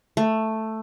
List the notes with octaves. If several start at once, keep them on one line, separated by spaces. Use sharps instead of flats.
A3